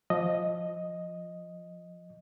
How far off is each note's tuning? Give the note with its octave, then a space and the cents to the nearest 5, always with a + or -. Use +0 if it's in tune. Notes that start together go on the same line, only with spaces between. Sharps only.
F3 +5 D#5 +0